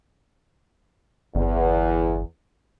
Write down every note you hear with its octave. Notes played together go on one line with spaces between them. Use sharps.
G1 E2